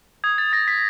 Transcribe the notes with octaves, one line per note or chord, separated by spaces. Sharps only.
D#6 G#6
A6
D#6 A#6
B6